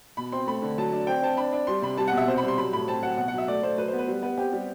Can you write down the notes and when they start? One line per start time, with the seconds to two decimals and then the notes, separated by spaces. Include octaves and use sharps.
0.17 B2 B5
0.32 C4 C6
0.47 A3 B5
0.62 D3
0.78 F#3 A5
0.93 D4
1.07 C4 G5
1.22 C4 A5
1.37 D4 B5
1.53 D4
1.67 G3 C6
1.82 C3 B5
1.97 G3 A5
2.08 B2 F#5
2.17 E5
2.28 C3 C5
2.38 B5
2.43 G3
2.48 C6
2.58 F#3 B5
2.73 A2 B5
2.88 C4 A5
3.03 F#3 F#5
3.17 B2 F#5
3.28 F#5
3.33 F#3 E5
3.48 A3 D5
3.63 A3 C5
3.78 F#3 B4
3.88 C5
3.93 B3
3.98 B4
4.08 G3
4.23 B3 B4
4.37 C4 G4
4.53 G3